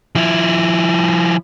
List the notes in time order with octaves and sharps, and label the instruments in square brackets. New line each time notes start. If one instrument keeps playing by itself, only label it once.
[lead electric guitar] F3 E4